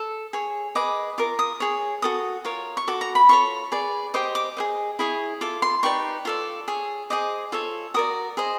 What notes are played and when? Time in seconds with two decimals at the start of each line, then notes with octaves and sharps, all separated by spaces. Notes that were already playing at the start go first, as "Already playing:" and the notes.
Already playing: A4
0.33 G#4 C#5
0.75 G#4 B4 D#5 D6
1.18 F4 A#4 D6
1.39 D#6
1.60 G#4 C#5
2.02 F#4 A4 D#6
2.45 F4 A#4 C#5
2.77 C#6
2.87 F#4 A4 D6
3.01 A#5
3.15 B5
3.29 F4 A4 C#5 C#6
3.72 G#4 B4 D5
4.14 G4 C5 D#5 D6
4.35 D6
4.57 G#4 C5 D#5
4.99 E4 G#4 C#5
5.41 F4 A4 D6
5.62 C6
5.83 D#4 G4 B4 D5 C#6
6.25 F4 A4 D5
6.68 G#4 C#5
7.10 G#4 C5 D#5 D6
7.52 F4 A4 C#5
7.94 F#4 A#4 D5 D#6
8.37 G#4 C5 D#5